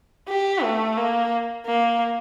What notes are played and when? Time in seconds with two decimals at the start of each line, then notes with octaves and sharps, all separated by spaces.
0.29 G4
0.63 A3
0.98 A#3
1.66 A#3